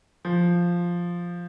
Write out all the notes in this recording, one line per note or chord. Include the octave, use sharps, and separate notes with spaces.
F3